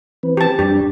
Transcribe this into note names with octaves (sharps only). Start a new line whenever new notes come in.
E3 C4 B4
G4 A5
F#2 G3 D4 G4